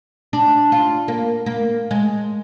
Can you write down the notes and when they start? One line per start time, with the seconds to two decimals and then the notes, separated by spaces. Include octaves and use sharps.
0.33 D4
0.72 F4
1.08 A#3
1.46 A#3
1.91 G#3